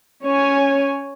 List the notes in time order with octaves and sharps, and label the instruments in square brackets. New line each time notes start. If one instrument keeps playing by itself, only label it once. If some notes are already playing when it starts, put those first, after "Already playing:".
[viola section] C#4 C#5 G#5